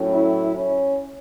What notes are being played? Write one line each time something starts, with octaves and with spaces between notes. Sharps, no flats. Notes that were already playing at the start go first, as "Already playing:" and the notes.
Already playing: A2 F#3 C#4
E4
C#4